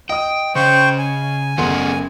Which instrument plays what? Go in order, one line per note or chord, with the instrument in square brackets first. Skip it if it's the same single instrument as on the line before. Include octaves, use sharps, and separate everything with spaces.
[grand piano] D#5 D#6 [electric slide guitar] G5
[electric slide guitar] C#3 C#4 [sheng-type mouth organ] C5 G5 C#6
[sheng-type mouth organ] G#5
[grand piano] F#1 F#5 C6 [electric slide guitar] A3 B3 G#4